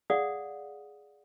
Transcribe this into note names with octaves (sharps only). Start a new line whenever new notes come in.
G#4 D5 F5 F#5 D#6